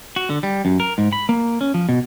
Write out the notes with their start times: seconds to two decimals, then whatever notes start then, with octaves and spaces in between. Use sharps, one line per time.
0.16 F#4
0.30 D3
0.43 G3
0.65 F#2
0.80 A#4
0.98 G#2
1.13 B5
1.29 A#3
1.61 C#4
1.74 F3
1.89 B2